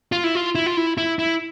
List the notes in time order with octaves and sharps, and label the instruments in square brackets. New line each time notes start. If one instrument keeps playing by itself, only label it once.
[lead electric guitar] F4
E4
F4
E4
F4
E4
E4
E4